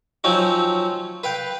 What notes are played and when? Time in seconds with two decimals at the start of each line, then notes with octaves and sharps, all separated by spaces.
0.24 F3 F#3 C4 C#4 D#4
1.24 B4 F5 G5